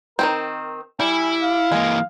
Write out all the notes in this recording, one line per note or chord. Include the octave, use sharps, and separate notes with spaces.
D#3 F3 C4 A#4
G3 E4 G#5
F5
E3 G#3 A#3